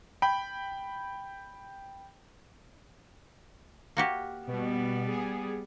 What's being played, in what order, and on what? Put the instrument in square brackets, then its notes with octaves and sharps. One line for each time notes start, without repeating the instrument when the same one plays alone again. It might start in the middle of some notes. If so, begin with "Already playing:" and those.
[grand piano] G5 B5
[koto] A#3 F#4 G4
[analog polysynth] B2 [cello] G3 B3
[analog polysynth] G#4